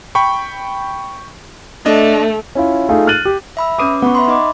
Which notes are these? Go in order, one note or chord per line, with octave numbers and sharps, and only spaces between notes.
G5 B5 C#6
A3 D4 D#5
C#4 E4 F4
A3 D#4 F4 G#4
F6 F#6 A6 D#7 F#7
G4
E5 B5 E6
C#4 B4 D6 D#6 D#7
B3 F#5 B5 C#6
E5 B5 C6
D#4 D#5 D6